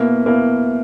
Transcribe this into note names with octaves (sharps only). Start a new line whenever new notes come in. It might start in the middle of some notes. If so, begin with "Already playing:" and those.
Already playing: B2 A#3 E4
B2 A#3 E4